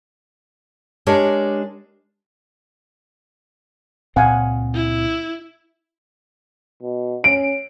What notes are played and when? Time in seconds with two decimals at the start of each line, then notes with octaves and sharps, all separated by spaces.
1.07 G#3 D4 G4 A#4 C#5
4.16 C#2 A#2 C4 F5 F#5 G#5
4.75 E4
6.83 B2
7.24 C#4 D7